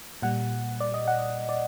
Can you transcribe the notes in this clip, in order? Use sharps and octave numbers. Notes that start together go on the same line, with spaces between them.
A#2 G3 F#5
D5
D#5
F#5
D5